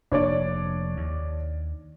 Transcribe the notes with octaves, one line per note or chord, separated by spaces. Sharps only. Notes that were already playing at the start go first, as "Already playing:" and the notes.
F1 A#3 D4 C#5 D5
D#2